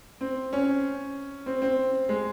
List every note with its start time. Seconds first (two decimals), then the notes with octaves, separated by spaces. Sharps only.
0.21 C4
0.53 C#4
1.46 C4
1.62 C4
2.09 G#3